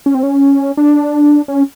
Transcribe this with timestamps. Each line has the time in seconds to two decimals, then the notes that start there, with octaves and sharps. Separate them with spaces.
0.06 C#4
0.15 C4
0.23 C#4
0.77 D4
1.48 C#4